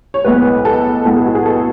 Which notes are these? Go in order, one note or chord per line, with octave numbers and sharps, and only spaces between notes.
C#5
B1 A2 G#3 B3 B4
A4
B1 A2 G#3 B3 A4
G#4
F#4
G#4
A4